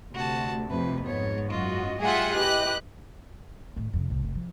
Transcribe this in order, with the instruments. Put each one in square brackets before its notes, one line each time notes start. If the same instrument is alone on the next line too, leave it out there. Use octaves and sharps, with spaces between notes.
[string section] D2 [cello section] C3 [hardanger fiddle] F#4 A5
[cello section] F2 C3 [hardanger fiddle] B4
[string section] G#2 [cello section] B3 [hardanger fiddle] C#5
[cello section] F#2 F#4 D#5 [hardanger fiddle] F4
[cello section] A2 G3 [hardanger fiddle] F4 G4 [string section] G#4 E5 F#5
[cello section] E4 G4 [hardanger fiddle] B4 [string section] D#5 F#6
[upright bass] A2 D#3
F2 C3
C2 A2
F1
F3